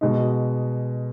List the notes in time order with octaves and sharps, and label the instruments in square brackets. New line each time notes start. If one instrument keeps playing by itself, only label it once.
[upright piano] B2 G#3 D#4